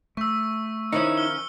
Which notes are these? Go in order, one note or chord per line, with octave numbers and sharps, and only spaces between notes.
A3 C#6 E6
D#3 F3 C#4 D#4 E4 C#7
F6 G7